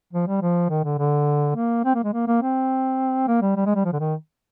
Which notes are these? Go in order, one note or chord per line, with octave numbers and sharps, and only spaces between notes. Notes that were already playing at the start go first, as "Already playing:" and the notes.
F3
G3
F3
D#3
D3
D3
A#3
C4
A#3
G#3
A#3
A#3
C4
A#3
G3
G3
G#3
G3
F3
D3
D#3